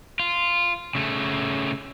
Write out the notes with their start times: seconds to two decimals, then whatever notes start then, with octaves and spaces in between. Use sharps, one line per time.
0.20 F4
0.95 C#3 A3